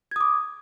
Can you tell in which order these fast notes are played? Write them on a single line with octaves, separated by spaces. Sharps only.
G#6 D#6 D6